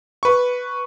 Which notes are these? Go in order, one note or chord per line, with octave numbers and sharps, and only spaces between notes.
B4 C#6